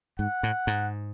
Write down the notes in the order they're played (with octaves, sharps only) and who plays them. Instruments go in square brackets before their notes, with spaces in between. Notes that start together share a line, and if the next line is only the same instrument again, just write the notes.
[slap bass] G#2 [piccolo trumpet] F#5
[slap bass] A2
G#2